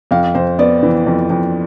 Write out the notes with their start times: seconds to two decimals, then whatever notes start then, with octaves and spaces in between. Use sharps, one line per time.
0.11 F2 F5
0.35 F2 C5
0.59 B3 D5
0.83 E3
1.06 F2
1.30 F2